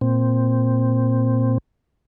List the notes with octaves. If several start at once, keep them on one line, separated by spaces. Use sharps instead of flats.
A#2 C4